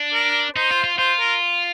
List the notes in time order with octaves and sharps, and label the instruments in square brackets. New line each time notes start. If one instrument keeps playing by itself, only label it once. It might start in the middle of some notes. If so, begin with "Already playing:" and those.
Already playing: [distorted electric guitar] D4
[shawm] A#4
[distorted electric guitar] D#4 [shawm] C5
[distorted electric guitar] F4
F4
[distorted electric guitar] F4 [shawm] C5
[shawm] A#4